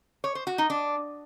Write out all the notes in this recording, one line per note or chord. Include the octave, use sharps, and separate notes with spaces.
C#5
C5
F#4
D#4
D4